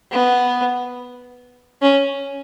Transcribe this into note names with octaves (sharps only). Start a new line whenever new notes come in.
B3
C#4